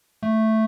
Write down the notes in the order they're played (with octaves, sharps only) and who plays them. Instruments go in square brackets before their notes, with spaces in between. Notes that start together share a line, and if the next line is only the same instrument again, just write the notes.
[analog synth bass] A3